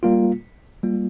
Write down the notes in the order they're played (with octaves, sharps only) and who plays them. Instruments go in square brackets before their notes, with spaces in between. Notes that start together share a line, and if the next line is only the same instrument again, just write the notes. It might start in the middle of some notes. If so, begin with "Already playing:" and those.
[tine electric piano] G3 A#3 F4
G3 A#3 F4